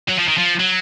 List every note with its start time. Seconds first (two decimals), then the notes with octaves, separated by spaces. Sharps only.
0.08 F#3
0.18 F3
0.28 D#3
0.38 F3
0.60 F#3